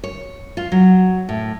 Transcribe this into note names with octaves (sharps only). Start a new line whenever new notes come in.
C#5
F4
F#3
A2